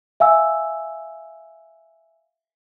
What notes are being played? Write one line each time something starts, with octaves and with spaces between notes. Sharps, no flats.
E5 F5 G#5 E6